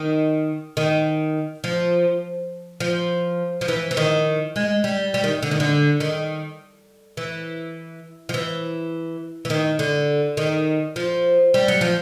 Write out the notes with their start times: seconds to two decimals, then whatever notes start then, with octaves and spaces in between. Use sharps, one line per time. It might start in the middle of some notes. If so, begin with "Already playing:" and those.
Already playing: D#3
0.77 D#3
1.64 F3
2.80 F3
3.61 F3
3.68 E3
3.91 E3
3.97 D#3
4.56 G#3
4.84 G3
5.14 G3
5.24 D#3
5.42 D3
5.51 D#3
5.60 D3
6.00 D#3
7.17 E3
8.29 F3
8.34 E3
9.45 E3
9.50 D#3
9.79 D3
10.37 D#3
10.96 F3
11.54 G3
11.68 F#3
11.81 F3